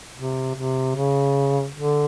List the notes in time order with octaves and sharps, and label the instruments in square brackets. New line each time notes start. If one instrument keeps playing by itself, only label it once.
[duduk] C3
C3
C#3
D3